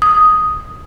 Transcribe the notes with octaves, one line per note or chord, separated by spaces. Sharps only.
D#6